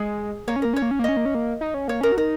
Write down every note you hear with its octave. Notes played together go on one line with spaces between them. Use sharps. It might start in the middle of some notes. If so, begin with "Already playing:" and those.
Already playing: G#3 G#4
A#3 C#5
C#4
A#3 A#4
C#4 C#5
A#3
C#4
A#3
C#4 D#5
A#3
C#4
A#3
D#4
C#4
A#3 C#5
C#4 A#4
F#4
D#4 A#4